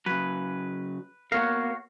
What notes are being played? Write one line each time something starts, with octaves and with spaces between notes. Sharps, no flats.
C#3 F#3 B4
A#3 B3 F#4 A#4 C#5 F5